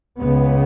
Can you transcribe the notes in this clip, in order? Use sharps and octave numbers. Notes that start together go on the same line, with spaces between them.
C#2 C#3 B3